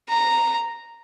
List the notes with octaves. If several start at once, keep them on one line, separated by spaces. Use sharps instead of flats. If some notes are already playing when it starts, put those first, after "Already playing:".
A#5